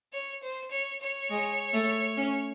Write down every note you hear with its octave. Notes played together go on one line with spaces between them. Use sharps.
C#5
C5
C#5
C#5
G#3
A3
C#4